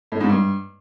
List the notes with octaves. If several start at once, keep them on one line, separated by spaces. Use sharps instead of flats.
A2
G#2
G2